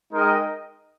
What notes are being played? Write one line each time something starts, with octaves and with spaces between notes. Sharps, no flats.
G#3 D#4 A#4 D#5 G5